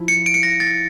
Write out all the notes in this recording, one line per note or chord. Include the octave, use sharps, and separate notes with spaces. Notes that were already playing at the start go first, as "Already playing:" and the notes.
Already playing: F3 E4
C#7
D7
C#7
A#6
A6